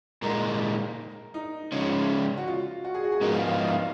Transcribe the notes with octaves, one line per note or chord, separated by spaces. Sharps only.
A#2 G#3 D#4 A#4
D#4
C#3 F3 G#3 C#4
F#4
F4
F#4
G#4
F#4
G#4
G#2 F3 B3 D#4 A#4
F5
F5
D#5
F5